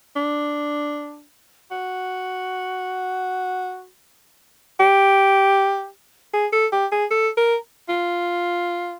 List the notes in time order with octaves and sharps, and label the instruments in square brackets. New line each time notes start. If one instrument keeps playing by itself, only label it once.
[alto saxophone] D4
F#4
G4
G#4
A4
G4
G#4
A4
A#4
F4